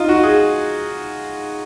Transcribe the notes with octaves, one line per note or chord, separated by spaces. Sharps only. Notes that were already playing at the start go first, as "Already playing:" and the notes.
Already playing: D#4 F4
F#4
G#4